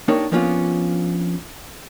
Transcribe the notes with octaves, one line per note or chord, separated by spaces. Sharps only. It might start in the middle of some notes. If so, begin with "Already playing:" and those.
A#3 D4 D#4 G4 A#4 C#5
F3 A#3 B3 C#4 D4 F4